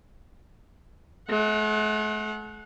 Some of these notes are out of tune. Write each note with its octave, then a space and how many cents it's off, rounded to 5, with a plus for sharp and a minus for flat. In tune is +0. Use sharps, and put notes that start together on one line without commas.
A3 -45 F#5 -15